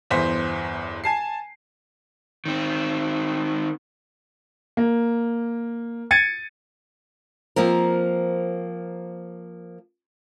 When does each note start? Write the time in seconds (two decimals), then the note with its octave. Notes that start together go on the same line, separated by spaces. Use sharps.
0.11 G1 E2 C5 B6
1.04 G#5 A5 C7
2.46 D#3 C4
4.77 A#3
6.11 G#6 A6 C#7 D#7
7.56 F3 A#3 C4 A#4